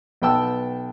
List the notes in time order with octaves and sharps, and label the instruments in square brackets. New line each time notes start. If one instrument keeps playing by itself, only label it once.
[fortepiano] B1 B3 G5 A5 E6